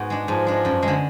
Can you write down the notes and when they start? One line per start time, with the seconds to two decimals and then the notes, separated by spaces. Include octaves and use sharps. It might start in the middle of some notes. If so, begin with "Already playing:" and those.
Already playing: G#2 B3 F#4
0.10 G#3 D4
0.28 G#2 F3
0.47 G#3 D4
0.65 F#2
0.83 G#3
0.88 D3